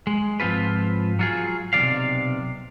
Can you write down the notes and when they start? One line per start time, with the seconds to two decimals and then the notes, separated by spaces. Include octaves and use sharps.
0.07 G#3
0.40 G#2 F3 C4 F4 B4
1.19 F#3 F4 G#4
1.73 B1 C3 D#3 D5 F5